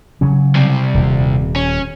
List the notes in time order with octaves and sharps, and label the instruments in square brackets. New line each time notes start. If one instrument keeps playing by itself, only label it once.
[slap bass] C#3 F#3 C#4
[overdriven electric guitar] C2 C3
[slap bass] D#1
[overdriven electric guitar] C#4